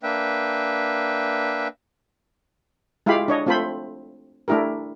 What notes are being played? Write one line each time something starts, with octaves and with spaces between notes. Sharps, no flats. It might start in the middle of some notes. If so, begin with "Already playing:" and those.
A#3 D4 B4 E5 G5
G#3 E4 F4 G4 F5 B5
D4 C#5 D#5
A3 C4 F4 A4 C5 B5
A3 D4 E4 G4 A#4